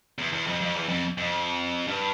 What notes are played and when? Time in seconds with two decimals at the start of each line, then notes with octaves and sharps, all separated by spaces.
0.18 E2
0.33 E2
0.47 F2
0.61 F2
0.75 E2
0.88 F2
1.18 F2
1.88 G2